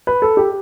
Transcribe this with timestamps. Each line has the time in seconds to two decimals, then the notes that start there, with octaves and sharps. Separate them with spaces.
0.07 B4
0.22 A4
0.37 G4